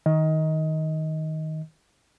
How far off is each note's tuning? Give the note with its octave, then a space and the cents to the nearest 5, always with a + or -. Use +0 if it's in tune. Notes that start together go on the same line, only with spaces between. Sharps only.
D#3 +10 D#5 +20